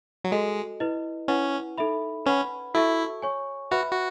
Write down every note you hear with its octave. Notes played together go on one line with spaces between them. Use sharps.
F#3
G#3 F#4 A4 D#5
E4 B4 D#5
C#4 E4 B4 F#5
D#4 A4 E5 B5
C#4 B4 F#5 B5
E4 F#4 A4 E5 A5 C#6
C#5 G#5 C#6
F#4 B4 E5 B5
F#4